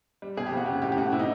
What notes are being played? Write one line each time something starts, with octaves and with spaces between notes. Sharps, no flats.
G3
B2 G#4
G4
F2
F#4
C#3 G4
A2 G4
G4
A2 F#4
C3 E4
D#4